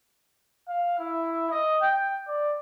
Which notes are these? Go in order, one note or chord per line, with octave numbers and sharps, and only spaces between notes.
F5
E4
D#5
G5
D5